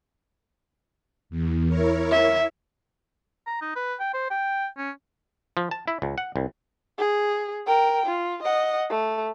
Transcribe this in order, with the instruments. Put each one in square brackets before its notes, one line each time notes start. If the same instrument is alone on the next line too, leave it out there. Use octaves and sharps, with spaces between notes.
[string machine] E2
E4 A#4 C#5
[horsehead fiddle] E5
[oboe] A#5
D#4
B4
G5
C5
G5
C#4
[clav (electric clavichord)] F3
A5
E4
C#2
F#5
C2
[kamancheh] G#4
A#4 G5
F4
D#5 F#5
A3